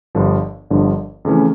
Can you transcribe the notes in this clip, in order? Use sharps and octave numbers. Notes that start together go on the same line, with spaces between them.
G1 G2 D3 F3
G1 G2 D3 F3
F2 C#3 E3 A3 C#4